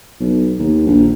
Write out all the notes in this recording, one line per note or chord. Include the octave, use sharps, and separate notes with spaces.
B1
D#2
A#1